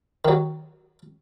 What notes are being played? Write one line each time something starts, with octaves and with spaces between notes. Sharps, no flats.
D#3 F#3